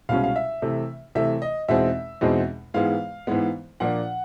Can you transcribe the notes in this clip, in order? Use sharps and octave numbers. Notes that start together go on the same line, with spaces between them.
C2 B2 G#3 C#4 F5
F5
E5
C3 E3 A3
C3 E3 A3 E5
D#5
E2 B2 G#3 C4 D#4 E5
E2 B2 G#3 C4 D#4
G#2 E3 G#3 B3 F5
G#2 E3 G#3 B3
A#2 F3 A#3 D4 F#5